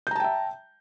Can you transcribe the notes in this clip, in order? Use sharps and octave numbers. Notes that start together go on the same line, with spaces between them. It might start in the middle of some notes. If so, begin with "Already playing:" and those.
E5 G5 A5 A#5 G6